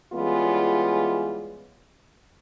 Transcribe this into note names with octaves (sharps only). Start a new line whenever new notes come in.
E3 G3 G#3 B3 C#4 F4